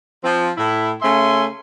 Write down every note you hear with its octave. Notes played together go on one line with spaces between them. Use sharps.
F3 C4
A2 E4
C#3 A3 C#4 E5 G#5 C6